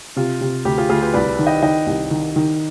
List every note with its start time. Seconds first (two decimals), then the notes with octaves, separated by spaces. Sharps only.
0.16 C3 F4
0.41 C3
0.65 D2 G4
0.78 F4 G#4
0.89 D2 F4 G#4
1.02 G4 B4
1.13 C2 B4 D5
1.39 D#3
1.46 D#5 G5
1.62 D#3 D#5 G5
1.86 C2
2.11 D#3
2.36 D#3